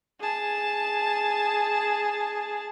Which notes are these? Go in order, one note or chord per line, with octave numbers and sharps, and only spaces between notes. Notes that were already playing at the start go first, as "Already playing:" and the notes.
G#4 A5